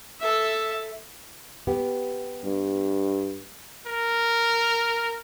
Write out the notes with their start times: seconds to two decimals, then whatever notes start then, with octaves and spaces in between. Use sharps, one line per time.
0.20 A4 E5
1.67 B3 G4
2.45 G2
3.87 A#4